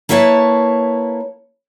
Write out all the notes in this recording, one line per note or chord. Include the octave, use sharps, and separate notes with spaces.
A#3 E4 B4 C#5 G5 A5